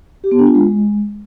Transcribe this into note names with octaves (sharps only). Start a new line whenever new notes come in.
G4
B3
D4
F4
G#3